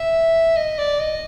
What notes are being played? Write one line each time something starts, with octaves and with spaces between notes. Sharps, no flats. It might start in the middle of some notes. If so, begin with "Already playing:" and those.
Already playing: E5
D#5
D5
D#5